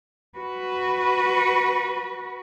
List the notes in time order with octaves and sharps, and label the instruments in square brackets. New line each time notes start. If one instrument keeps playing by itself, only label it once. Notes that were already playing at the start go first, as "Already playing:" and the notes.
[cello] F#4 B4